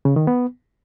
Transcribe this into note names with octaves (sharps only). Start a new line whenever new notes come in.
C#3
D#3
B3